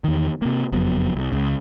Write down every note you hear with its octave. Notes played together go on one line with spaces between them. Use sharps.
E2 D#3
C3 A#3
F#1 F2 F#3 B3
C2
C#2 C#3